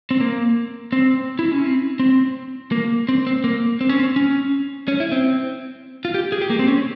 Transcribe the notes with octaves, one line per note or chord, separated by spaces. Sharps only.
C4
A#3
C4
E4
C#4
C4
C4
A#3
C4
C4
A#3
C4
C#4
C4
C#4
C#4
E4
C4
F4
G4
G#4
G4
A#3
C4
C#4